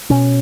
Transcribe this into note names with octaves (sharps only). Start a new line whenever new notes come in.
B2 C#4